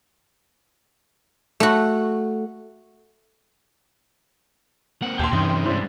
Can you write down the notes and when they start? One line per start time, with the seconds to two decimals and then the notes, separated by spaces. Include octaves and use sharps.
1.60 A3 F#4
5.02 A#3 C4 F#5
5.19 D#2 A#2 G4 G5 A5 C6
5.33 G2 C3 E3 C#4 D#4
5.66 G#2 G3 D4 E4 C5